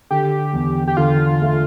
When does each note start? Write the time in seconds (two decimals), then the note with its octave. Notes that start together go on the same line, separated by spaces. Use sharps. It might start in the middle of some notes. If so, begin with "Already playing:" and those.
0.11 D3 G4
0.53 E2
0.87 G4
0.97 D3 F4
1.41 A3